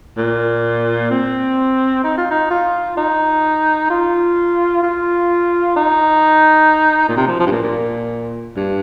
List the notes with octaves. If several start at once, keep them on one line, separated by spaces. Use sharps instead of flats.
A#2
C4
D#4
F4
D#4
F4
D#4
F4
F4
D#4
A#2
C3
F3
F3
G2
A#2
A#2
G2